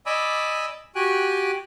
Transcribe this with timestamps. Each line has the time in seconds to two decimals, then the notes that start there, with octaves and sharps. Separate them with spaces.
0.06 D5 D#5 G#5 B5 D6 E6
0.95 F#4 G4 G5 G#5 F#6